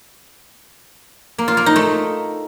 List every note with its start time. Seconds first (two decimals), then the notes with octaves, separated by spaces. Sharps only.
1.38 A#3
1.48 F4
1.57 A#3
1.66 D#4
1.76 A3